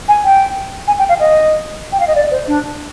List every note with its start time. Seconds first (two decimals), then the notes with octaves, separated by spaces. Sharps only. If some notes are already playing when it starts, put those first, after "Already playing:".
0.08 G#5
0.24 G5
0.88 G#5
0.99 G5
1.09 F5
1.20 D#5
1.92 G5
2.00 F5
2.07 D#5
2.15 D5
2.31 C5
2.48 D4